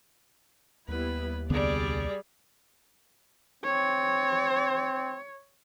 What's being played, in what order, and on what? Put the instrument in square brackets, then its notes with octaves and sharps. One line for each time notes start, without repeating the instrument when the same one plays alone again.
[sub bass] D#2 [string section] G3 B3 E4 [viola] B4
[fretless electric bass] C2 D3 B3 [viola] G3 G#4 [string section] D5
[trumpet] C4 [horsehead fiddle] C#5